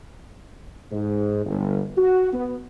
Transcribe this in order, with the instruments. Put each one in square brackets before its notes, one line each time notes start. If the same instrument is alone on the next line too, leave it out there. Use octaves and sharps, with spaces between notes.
[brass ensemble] G#2
G1
F#4
B3